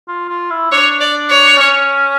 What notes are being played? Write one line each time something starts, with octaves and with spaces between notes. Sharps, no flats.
F4
F4
E4
D4 C#5
D5
C#5
C#4